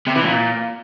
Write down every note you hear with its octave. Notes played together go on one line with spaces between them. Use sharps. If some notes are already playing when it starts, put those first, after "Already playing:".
C3
E3
A#2